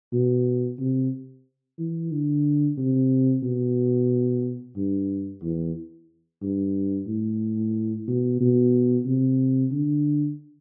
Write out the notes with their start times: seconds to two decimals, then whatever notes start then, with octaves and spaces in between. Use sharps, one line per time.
0.13 B2
0.79 C3
1.79 E3
2.12 D3
2.78 C3
3.43 B2
4.77 G2
5.42 E2
6.42 G2
7.07 A2
8.07 B2
8.40 B2
9.06 C3
9.72 D3